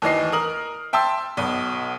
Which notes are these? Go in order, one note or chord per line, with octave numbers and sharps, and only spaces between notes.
D#2 E3 D#5 C7
A#4 D#6 F6 F#7
E5 G5 A5 C6 E6
B1 B2